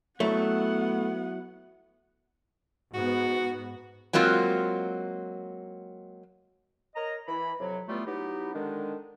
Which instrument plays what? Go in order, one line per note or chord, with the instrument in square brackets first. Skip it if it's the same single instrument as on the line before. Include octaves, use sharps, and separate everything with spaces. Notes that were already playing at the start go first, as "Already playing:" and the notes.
[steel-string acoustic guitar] F#3 E4 [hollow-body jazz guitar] A3 [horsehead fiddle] B3 F#5
[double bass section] G#2 B3 [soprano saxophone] F#4
[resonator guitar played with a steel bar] F#3 G#3 A#3 C4 F4
[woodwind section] A#4 C#5 D#5 A#5
E3 B5
F2 C3 F#3
E3 G3 A3 B3 F4
F#3 B3 D#4 E4 G4
D3 D#3 G#3 D4